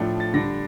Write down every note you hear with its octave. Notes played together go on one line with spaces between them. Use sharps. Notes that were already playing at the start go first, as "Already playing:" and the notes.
Already playing: A2 F3 A3 D4
A6
D3 G3 D4 A#6